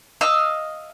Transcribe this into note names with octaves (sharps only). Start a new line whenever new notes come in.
D#5 F5 E6